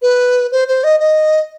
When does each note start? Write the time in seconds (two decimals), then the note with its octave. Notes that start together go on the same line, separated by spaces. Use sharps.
0.02 B4
0.52 C5
0.68 C5
0.84 D#5
1.00 D#5